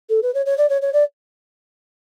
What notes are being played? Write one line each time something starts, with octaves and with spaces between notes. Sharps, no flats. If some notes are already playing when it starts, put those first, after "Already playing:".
A4
B4
C#5
C#5
D5
C#5
C#5
D5